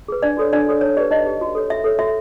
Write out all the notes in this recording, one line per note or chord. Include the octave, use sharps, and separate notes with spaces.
G#4 B4
D4 D5
F#4 A4 C#5
D4 D5
F#4 A4 C#5
D#4 C#5
G4 B4 D5
D#4 D#5
G4 B4
F#4
A4 C#5
F#4 E5
A4 C#5
F#4 E5